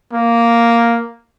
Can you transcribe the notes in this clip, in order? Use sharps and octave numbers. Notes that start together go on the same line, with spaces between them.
A#3